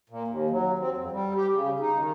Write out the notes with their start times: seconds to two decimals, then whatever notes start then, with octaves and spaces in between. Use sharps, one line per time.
0.10 A#2
0.28 D#2
0.50 F#3
0.79 C4
0.97 F2
1.11 G3
1.36 G4
1.53 C#3
1.80 D#4
1.98 D#3